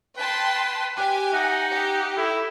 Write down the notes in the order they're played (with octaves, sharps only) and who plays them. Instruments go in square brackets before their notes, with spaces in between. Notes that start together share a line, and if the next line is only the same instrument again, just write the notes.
[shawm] B4 [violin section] G5 A5 C6
[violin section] G4 G#5 [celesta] G5 D6 F#6
[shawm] D#4 [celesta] E5 F#6 A#6 [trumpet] F#5
[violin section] G4
[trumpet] E4 [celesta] A4